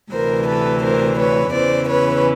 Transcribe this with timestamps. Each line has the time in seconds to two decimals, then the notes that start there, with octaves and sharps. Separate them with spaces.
0.11 D2 C3 E3 A#4 C5
0.47 A4 B4
0.82 A#4 C5
1.18 B4 C#5
1.53 E2 C#3 E3 C5 D5
1.88 B4 C#5